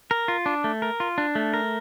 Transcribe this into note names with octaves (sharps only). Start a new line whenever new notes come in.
A#4
F4
D4
A3
A#4
F4
D4
A3
A#4